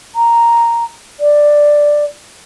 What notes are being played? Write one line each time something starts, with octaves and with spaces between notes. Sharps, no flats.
A#5
D5